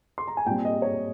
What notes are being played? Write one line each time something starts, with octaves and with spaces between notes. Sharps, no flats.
C6
A#5
G#5
A#2 G3 C4 G5
D#5
C#5